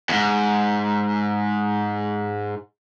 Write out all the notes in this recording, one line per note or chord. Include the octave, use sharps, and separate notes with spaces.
E2 G#2